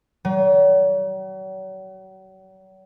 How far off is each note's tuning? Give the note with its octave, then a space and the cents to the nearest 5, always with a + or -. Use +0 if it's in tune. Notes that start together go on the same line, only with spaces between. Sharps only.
F#3 +40